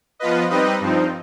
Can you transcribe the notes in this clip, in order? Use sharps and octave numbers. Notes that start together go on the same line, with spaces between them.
F3 B3 F4 B4 D#5
G3 C4 D#4 B4 D#5
G2 F3 C4 D#4